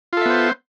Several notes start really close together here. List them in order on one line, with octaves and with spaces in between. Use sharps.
F4 A4 E5 B3 C5